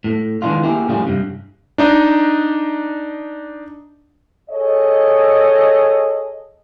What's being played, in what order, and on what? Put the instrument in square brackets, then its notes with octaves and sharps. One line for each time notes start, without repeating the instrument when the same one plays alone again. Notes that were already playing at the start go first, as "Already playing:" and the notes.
[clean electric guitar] A2
D#3 E3 G3 G#3 D4 F4
A#3 E4 G4 G#4 A#4
A2 C#3 F3 G3 F4 G#4
G2 C3
[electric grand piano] D4 D#4 D#5
[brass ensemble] G#4 A4 C#5 D#5